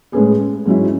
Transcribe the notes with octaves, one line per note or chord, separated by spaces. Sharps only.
A2 G#3 C#4 G#4 B4
G#2 F#3 C#4 E4